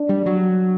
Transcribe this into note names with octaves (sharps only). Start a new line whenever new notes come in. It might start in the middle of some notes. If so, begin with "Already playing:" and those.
Already playing: D4
G3
F#3